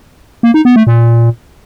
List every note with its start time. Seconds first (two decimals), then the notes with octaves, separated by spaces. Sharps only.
0.43 A#3
0.54 D#4
0.65 B3
0.76 A3
0.87 A#2